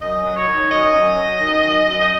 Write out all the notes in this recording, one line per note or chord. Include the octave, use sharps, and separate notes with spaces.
F#2 D#5
F#3
C#5
D#3
F#2 D#5
F#2
F#3
D#3
F#2
F#2
D#5